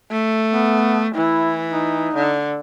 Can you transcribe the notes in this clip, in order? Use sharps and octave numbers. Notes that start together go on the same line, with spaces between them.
A3
B3
E3 E4
D#4
D3